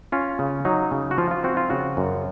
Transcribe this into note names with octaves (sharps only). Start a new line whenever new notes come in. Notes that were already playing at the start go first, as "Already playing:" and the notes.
C#4 F4
C#3
F#3 D#4
C#3
F#4
F3 F4
F4
C4 F#4
F4
C#3 F#4
F#2